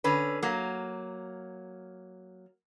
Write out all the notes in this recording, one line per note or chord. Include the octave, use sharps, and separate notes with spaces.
D3 C#4 B4
F#3 A#3